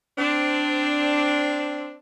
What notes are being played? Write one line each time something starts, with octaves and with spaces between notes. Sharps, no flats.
C4 D4